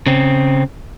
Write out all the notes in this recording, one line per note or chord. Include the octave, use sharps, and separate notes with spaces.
C#3 C4